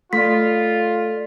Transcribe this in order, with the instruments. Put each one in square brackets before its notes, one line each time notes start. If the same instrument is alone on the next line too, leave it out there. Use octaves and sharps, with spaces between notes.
[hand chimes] A3 C6 B6 [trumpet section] F4 [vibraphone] A4 D5